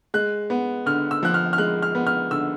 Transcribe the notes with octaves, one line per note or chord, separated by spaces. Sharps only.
G#3 F#6
B3
D3 F6
E6
F3 F#6
F6
F6
G#3 F#6
F6
B3
F6
D3 E6